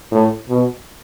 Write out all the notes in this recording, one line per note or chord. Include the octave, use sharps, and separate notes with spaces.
A2
B2